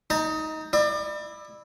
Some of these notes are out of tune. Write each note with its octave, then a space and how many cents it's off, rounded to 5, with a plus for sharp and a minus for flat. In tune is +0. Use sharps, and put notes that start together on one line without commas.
D#4 +15 A#5 -45
E4 -5 D5 +35